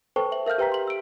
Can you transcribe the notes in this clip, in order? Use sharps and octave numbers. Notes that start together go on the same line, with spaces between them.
A4 B4 C5 G5 A5 C#6
E5 F#7
A#4 E5 F5 F6 G6
G4 B4 G5 A#5 B6
C6 F#7
E6 D7